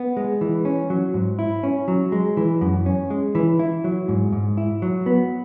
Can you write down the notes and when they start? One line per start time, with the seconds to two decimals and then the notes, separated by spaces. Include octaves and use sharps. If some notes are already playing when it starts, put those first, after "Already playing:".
Already playing: B3
0.17 G#3
0.41 E3
0.65 C#4
0.90 F#3
1.14 G#2
1.39 E4
1.63 C#4
1.88 F#3
2.12 G#3
2.37 E3
2.61 F#2
2.86 C#4
3.10 G#3
3.35 E3
3.59 E4
3.84 F#3
4.08 G#2
4.32 G#2
4.57 E4
4.82 F#3
5.06 B3